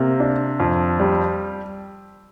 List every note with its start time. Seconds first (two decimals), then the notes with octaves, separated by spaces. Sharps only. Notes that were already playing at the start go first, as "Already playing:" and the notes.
Already playing: C3 A#3
0.20 D4
0.60 F2
1.00 G3